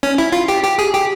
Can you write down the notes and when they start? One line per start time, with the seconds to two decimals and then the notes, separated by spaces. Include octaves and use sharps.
0.03 C#4
0.18 E4
0.32 F4
0.48 G4
0.64 G4
0.79 G#4
0.94 G4